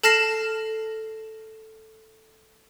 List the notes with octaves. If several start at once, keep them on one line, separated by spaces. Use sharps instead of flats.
A4 A5 F6 A#6 C7 E7